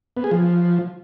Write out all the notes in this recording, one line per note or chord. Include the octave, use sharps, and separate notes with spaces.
B3
G#4
F3